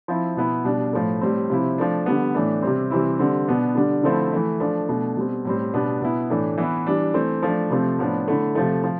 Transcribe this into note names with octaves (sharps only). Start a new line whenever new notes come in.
F3 C4 E4
B2 B3 E4
B2 G3 D4
A2 F3 A3
A2 G3 C4
C3 F3 C4 E4
F3 A3 D4
D3 G3 B3
A2 E3 A3 D4
C3 G3 C4
C3 E3 G3 C4 E4
D3 G3 C4
B2 B3 D4
D3 G3 D4
D3 F3 A3 C4 E4
E3 A3 E4
F3 A3 D4
B2 A3 D4
B2 G3 C4
A2 G3 C4
B2 G3 B3 D4
B2 B3 E4
A2 E3 A3 D4
E3 B3 E4
E3 G3 D4
E3 A3 C4
F3 A3 D4
C3 F3 A3 C4
A2 F3 B3 D4
D3 A3 E4
C3 F3 A3
F3